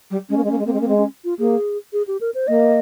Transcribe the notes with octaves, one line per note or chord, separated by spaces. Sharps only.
G3
G#3 C#4
A#3
G#3
A#3 C#4
G#3
A#3 C4
G#3
A#3 C#4
G#3 C4
C#4
F4
A#3 G#4
G#4
G4
A#4
C5
A#3 D#5